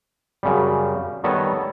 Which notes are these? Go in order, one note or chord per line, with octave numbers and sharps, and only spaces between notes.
F#2 C#3 G3
D#3 G3 B3 A4 C#5 D#5